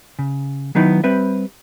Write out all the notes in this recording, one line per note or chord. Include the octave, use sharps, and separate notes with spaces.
C#3
D#3 F#3 B3 D#4 E4
G3 C4 B4 E5